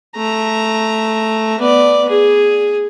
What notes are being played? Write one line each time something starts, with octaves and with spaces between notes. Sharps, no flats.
A3 A#5
B3 D5
G#4